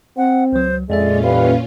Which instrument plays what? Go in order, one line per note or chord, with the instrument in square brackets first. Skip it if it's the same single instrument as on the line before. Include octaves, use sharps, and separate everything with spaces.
[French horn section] C4 [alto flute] F#5
[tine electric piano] C#2 F#3 [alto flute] C5
[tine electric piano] F2 A4 E5 [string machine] A#2 C#4 F4 [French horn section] G#3 [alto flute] D5
[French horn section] E3 G3 B4 [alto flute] F5